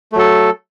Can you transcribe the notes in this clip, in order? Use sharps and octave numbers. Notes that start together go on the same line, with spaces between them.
F#3 A3 A4